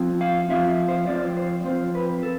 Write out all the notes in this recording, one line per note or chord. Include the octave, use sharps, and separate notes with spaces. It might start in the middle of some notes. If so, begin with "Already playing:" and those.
Already playing: F3 C4 F4
F5
F3 C4 F4 E5
C5
F3 C4 F4 D5
C5
F3 C4 F4 C5
B4
A4